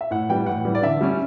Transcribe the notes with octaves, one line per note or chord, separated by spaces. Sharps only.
E5
A2 F#5
E3 G3 G5
A2 F#5
E3 G3
D5
D3 E5
G3 C#4